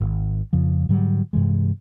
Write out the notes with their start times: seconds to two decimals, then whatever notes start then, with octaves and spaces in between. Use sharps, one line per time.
0.01 G#1
0.53 F2 C#3 F3
0.89 G#2 D3 F#3 G3
1.33 G2 C3 E3 G#3